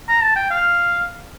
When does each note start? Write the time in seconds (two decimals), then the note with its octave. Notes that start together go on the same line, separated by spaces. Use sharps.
0.08 A#5
0.22 A5
0.36 G5
0.50 F5